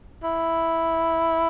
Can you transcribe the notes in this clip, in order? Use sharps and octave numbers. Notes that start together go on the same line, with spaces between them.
E4